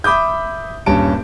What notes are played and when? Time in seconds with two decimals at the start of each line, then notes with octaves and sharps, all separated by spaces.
0.04 E5 B5 D6 D#6 G6
0.86 D#1 G2 C#4 A5 D7